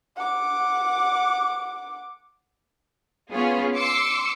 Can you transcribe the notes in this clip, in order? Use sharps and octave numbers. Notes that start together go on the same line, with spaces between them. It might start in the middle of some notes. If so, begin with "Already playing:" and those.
F#5 D6
B3 C#4 F4 G#4
C6 D6 E6 C#7